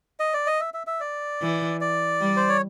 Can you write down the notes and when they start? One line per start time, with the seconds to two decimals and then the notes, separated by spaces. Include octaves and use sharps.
0.20 D#5
0.34 D5
0.47 D#5
0.60 E5
0.74 E5
0.87 E5
1.00 D5
1.41 E3
1.81 D5
2.21 G3
2.37 C5
2.49 C#5